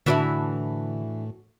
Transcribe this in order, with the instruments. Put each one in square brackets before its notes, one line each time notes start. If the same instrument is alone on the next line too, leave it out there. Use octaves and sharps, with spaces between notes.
[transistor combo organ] A2 [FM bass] D3 [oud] E3 D4 E4 [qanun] F#4 E5